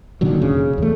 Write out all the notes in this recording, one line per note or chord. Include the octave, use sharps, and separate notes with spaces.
A#2 D3 D#3 F#3
F1 C#3
E2 A3